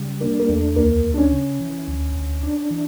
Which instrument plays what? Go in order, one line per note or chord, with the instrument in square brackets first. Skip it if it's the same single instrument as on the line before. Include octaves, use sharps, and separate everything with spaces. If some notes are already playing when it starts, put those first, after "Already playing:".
Already playing: [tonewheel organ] C#3 G3
[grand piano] A#3 [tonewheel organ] D4
[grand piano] A#3
[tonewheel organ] E2 [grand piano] A3
[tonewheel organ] D2 [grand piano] A#3
[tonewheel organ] D2
[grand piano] D4
C#4
[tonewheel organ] C#3
E3
D2
D2
D4
E3